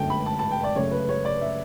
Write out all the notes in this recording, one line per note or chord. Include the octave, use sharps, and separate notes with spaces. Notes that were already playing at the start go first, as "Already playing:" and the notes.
Already playing: G1 F#2 D3 A3 G5 A5
B5
A5
A5
G5
D5
F#2 C#3 F#3 A3 C#5
B4
C#5
D5
E5